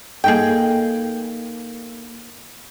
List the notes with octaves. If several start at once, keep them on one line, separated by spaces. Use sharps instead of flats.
A#3 D#4 G#4 A4 G5